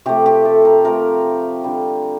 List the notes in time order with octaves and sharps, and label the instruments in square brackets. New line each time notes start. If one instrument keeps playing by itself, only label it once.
[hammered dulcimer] C3 F3 A3 G4
G4
A4
A#4
C3 F3 A3 A#4
D3 G3